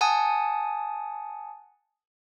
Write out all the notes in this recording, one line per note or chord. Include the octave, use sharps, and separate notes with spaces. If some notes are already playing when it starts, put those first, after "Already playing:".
F#5 G#5 A5 D#6